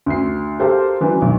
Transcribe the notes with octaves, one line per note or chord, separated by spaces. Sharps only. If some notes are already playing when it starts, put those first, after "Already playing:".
D2 C7
G4 A4 A#4 C5 F5 C6
D3 E3 F#3
B1